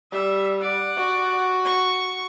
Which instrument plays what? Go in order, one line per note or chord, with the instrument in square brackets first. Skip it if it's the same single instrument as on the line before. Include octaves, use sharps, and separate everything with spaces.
[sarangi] G3 [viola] E5
[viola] D5 F#5
[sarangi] F#4
[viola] C#6